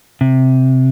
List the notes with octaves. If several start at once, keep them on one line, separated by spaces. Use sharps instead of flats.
C3